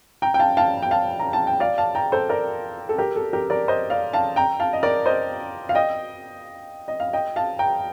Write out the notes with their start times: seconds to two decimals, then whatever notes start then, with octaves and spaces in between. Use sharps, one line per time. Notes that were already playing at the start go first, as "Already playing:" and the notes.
0.22 G5 A#5
0.34 G5
0.39 F5 A5
0.57 F5 A5
0.82 G5
0.91 F5 A5
1.20 A#5
1.33 A5
1.47 G5
1.60 D5 F5
1.78 F5 A5
1.95 G5 A#5
2.12 A4 C5
2.29 A#4 D5
2.89 A4
2.98 G4 A#4
3.16 A4
3.33 G4 A#4
3.50 A#4 D5
3.68 C5 D#5
3.90 D5 F5
4.13 F5 A5
4.36 G5 A#5
4.60 F5 A5
4.73 D#5
4.83 A#4 D5
5.06 C5 D#5
5.69 F5
5.75 D#5 G5
6.88 D#5
7.00 F5
7.13 D#5 G5
7.36 F5 A5
7.59 G5 A#5